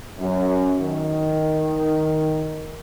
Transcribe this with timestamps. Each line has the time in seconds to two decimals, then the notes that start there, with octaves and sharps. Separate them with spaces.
0.19 F#2
0.79 D#3